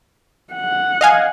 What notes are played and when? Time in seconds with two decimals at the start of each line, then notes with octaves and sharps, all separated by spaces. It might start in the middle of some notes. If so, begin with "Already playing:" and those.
0.54 F#5
1.01 D#5 F5 G#5